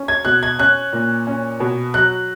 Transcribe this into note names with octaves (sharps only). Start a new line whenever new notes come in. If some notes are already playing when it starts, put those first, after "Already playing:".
Already playing: C#4
G#6
B2 F#6
G#6
C#4 F#6
A#2
C#4
B2
F#3 F#6